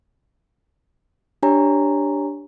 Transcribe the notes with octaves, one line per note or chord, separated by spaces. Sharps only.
D4 G4 C#5 G#5 A#5